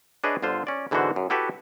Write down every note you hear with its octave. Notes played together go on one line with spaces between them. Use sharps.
D4 G#4 B4 C#5 D#5 E5
G1 D3 F4 C5
C#4 D5
G#2 D3 E3 B3 F#4 C5
F#2
E4 F#4 G4 A4 B4 E5